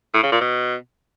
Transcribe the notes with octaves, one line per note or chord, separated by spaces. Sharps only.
A2
C#3
A#2
B2